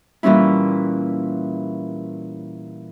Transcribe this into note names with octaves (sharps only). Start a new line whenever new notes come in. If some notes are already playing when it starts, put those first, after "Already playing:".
A#2 E3 G3 C#4 E4